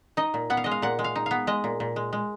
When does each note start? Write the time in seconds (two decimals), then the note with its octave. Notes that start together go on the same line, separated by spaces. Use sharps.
0.17 D#4 D#5
0.34 A#2
0.50 B3 F#5
0.57 F5
0.64 G#3 D#5
0.71 F5
0.82 A#2 F#5
0.99 G#3
1.04 F5
1.16 D#4
1.26 B3 F5
1.47 G#3 D#5
1.64 A#2
1.80 A#2
1.96 G#3
2.13 G#3